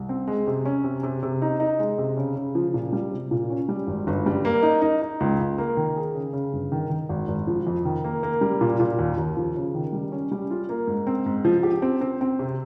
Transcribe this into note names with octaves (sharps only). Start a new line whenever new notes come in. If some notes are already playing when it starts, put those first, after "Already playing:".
Already playing: C2
C4
G#3
C3
C#4
C3
C3
C3
D#4
D#4
G#3
C3
C#3
C#3
F3
A#2
G3
C3
A#2
C#4
G3
G#1
G1
G3
A#3
D#4
D#4
D#4
C#2
C#2
A#3
D#3
G#4
C#3
C#3
G1
D#3
D#3
G#1
G#1
F3
F2
D#3
A#3
A#3
G3
A#2
A#2
D#2
D#2
F3
C#3
D#3
G3
C#4
G3
F4
A#3
G#2
C4
G#2
F3
G4
C4
C4
C4
C3